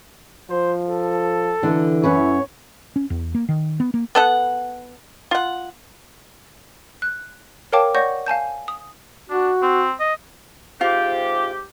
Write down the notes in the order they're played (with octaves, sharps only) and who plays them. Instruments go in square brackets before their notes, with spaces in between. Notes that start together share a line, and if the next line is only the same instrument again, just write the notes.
[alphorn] F3 [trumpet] C5
[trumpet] A4
[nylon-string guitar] D3 D#4 [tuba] E3
[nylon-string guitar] F#2 C#4 B4 [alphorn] E4 [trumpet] C#5
[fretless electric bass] C#4
E2
A#3
D#3
B3
A#3
[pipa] B3 A4 F#5
F4 F#5
[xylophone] F#6
A#4 C#5 F5 G5 A5 D6
C#5 D5 F#5 C#6 G6 A#6
F5 G#5 A5 G6
D#6
[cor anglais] D4 [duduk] F#4
[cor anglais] C4
D#5
[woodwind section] G#2 C3 G4 [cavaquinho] F4